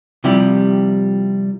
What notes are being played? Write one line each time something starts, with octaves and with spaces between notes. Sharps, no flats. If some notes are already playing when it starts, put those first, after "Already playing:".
C3 F3 G3 E4 G4